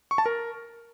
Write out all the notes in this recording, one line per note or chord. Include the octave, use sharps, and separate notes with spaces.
C#6
A5
A#4